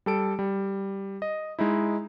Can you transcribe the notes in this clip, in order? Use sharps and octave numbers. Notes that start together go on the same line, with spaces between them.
G3 A4 D7
G3
D#5
G#3 D#4 E4